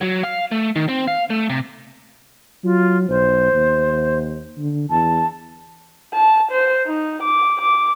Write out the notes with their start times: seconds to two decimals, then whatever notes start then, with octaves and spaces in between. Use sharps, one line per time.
0.01 F#3
0.23 F5
0.52 A3
0.76 D#3
0.89 C4
1.07 F5
1.30 A3
1.50 C3
2.64 F#3 F4
3.09 B1 C5
3.53 D#2
4.58 D3
4.90 E2 A5
6.14 A5
6.51 C5
6.86 D#4
7.23 D6
7.61 D6